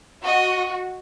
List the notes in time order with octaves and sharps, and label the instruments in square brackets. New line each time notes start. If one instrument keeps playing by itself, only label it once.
[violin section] F#4 [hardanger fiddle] D#5